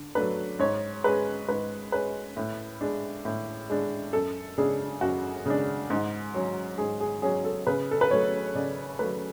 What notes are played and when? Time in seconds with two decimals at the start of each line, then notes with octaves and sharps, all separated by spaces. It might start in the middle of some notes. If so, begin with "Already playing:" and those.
Already playing: D3
0.15 F#3 A3 D4 B4
0.59 G#2 C#5
1.04 G#3 C#4 B4
1.48 G#2 B4
1.92 G#3 C#4 B4
2.37 A2
2.81 G#3 D4
3.25 A2
3.70 G#3 D4
4.13 F#2 A4
4.58 C#3 G#3 D4 G#4
5.01 F#2 F#4
5.46 C#3 G#3 D4
5.90 G#2
6.34 F#3 C#4
6.78 G#2 G#4
7.00 G#4
7.22 F#3 C#4 G#4
7.45 A4
7.67 C#3 B4
7.91 A4
8.01 B4
8.10 F#3 A3 C#5
8.55 C#3 D5
8.99 F#3 A3 B4